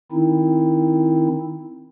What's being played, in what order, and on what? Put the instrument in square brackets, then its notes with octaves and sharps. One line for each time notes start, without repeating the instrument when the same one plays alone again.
[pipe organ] D#3 C4 D#4 E4